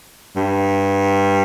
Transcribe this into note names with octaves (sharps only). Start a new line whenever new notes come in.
G2